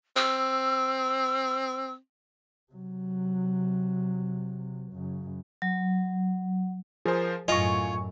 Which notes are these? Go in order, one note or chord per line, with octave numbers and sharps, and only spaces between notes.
C4 E6
C3 F#3
F#2 C#3
F#3
F3 G#4 A#4 C5
F#2 A2 F4 D#5 F5 G#5 C#6